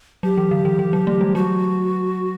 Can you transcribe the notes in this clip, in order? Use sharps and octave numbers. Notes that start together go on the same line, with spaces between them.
F#3 G4
E3
D3
E3
E3
F#3
A3
G3
F#3 F#4